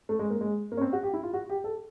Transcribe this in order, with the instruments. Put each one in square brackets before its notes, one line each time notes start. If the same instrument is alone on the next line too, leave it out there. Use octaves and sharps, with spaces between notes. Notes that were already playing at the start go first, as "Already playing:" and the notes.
[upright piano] A3
G#3
A#3
G#3
A#3
C#4
C4
F#4
G4
E4
F4
F#4
G4
A4